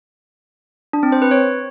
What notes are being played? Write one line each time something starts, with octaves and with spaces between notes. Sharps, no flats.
D4
C4
C5
B4
C#5